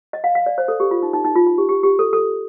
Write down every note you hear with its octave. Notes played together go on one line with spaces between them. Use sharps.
D#5
F5
F5
D5
C5
A4
G4
F4
D#4
D#4
D#4
F4
F4
G4
G4
G4
A4
A4